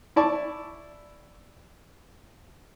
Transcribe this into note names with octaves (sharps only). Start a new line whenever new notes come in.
E4 D5 A5 C#6